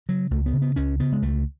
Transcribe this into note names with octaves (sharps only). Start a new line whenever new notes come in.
C#3 F#3
C#2 A3
B3
C#3
B3
C#2 C#4
C#3 B3
G#3
C#2 A3